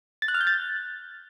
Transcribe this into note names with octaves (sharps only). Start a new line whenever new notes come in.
A6
F#6
F6
G6
A6